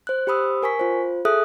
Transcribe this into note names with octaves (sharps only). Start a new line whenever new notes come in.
C5 F#6
G4 C5 B5 D#6 E6
A#4 G#5 C#6 B6
F4 C5
G#4 A4 E5 D#6 F#6